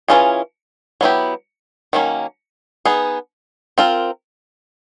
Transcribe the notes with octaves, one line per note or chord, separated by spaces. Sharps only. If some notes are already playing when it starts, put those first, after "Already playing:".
E3 A3 C#4 F4 G#4
F#3 B3 E4 G4
D#3 F#3 A#3 C#4
B3 D#4 G#4
C4 F4 A#4